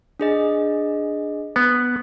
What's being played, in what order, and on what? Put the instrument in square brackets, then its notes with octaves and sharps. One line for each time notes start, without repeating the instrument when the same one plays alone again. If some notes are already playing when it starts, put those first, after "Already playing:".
[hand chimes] D4 G#4 D#5
[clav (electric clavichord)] B3